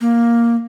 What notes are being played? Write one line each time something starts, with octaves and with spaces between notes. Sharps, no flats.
A#3